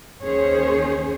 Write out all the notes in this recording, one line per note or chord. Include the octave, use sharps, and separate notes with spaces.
D#2 D#3 C#4 G#4 C5 C#5